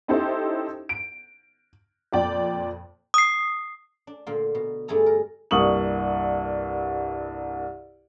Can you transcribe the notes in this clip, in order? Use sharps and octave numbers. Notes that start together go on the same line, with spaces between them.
C#4 D#4 E4 G4 A4 C5
D7
F2 A#2 D5 G5
D#6 C7
D4
A#2 D3 A#3
B2
G2 A3 G#4 A4 A#5
A#4
C2 G2 A#3 C#6 D#6 F#7